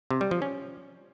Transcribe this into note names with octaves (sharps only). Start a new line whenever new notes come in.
C3
G3
F3
C#4